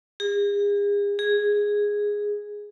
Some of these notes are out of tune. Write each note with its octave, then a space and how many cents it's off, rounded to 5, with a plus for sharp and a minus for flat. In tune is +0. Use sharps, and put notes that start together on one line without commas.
G#4 -40
G#4 -5